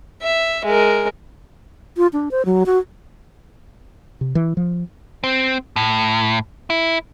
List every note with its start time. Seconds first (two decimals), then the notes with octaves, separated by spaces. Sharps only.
0.22 E5
0.65 G#3 A#4
1.97 F4
2.13 D4
2.31 C5
2.45 F#3
2.66 F#4
4.21 C3
4.35 E3
4.57 F3
5.24 C4
5.76 A2
6.70 E4